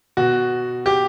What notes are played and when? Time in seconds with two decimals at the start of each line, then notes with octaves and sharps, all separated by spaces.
0.17 B2 F#4
0.86 G4